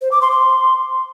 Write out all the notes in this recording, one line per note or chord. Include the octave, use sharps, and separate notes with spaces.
C5
D6
C6
C6